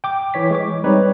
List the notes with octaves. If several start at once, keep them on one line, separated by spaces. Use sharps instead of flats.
G5 D6
E3 C#5 B6
G#3 C#6 D6
G3 C4 D#4 B4 C#5